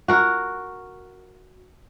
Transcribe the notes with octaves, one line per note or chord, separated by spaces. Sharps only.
F#4 A#4